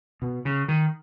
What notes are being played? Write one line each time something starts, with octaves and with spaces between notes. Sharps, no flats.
B2
C#3
D#3